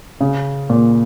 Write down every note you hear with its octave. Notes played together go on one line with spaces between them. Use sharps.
C#3
A#2